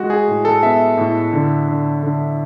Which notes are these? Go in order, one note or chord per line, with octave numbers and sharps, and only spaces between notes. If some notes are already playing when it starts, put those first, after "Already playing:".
Already playing: G#3 F#4
G#4
A2
A4
B3 E5
A2
D3
D3
D3